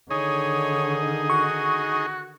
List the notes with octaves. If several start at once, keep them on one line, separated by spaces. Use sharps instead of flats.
D3 D#3 D#4 G#4 C#5
F#4 C#6